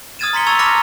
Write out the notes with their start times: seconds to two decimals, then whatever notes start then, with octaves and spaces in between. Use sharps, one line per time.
0.19 D#6 F6 G#6 A6 D#7 E7
0.33 A#5 C6 B6 C#7 G7
0.46 A5 C#6 E6 G#6 A6 F7
0.59 A#5 B5 D6 F6 A#6 C#7